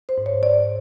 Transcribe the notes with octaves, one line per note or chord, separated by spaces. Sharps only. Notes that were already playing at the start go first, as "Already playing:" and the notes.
C5
G#2
C#5
G#2 D5